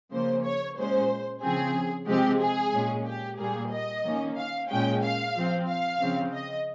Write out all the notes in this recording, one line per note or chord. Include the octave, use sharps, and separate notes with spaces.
C#3 F3 A#3 C5
C#5
A#2 G#3 C#4 C5
C#3 F3 C4 G#4
C3 F3 G#3 C4 G4
G#4
A#2 G#3 C#4
G4
A#2 G3 A#3 G#4
D#5
D#3 A#3 C#4
F5
A#2 G#3 C#4 G5
F5
F3 C4
F5
C#3 F3 C4
D#5